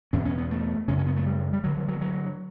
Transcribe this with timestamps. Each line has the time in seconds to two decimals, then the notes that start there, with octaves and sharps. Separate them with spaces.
0.13 E2 B2 C#4
0.25 C#4
0.38 B3
0.51 A3
0.88 F#2 C#3 C#4
0.98 C#4
1.07 B3
1.16 A3
1.26 G3
1.53 G3
1.64 G2 D3 F#3
1.77 F#3
1.88 F#3
2.01 F#3